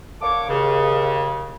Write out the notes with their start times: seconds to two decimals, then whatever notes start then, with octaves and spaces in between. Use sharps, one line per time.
0.22 D3 A#3 A4 C#5 D6
0.48 D#2 C#3